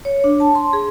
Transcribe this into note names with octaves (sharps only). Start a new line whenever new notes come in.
C#5
D4
A5
C6
G#4